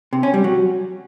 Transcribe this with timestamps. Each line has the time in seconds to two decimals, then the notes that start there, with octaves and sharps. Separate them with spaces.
0.13 C3
0.23 C#4
0.34 G3
0.44 F#3